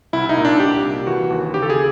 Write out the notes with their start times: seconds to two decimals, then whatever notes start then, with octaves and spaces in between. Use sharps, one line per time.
0.13 C2 E4
0.29 D#4
0.37 A#2
0.45 D4
0.60 C2 G4
0.84 C2
1.07 E3 F#4
1.30 D#2
1.54 C#3 G4
1.62 A4
1.70 G#4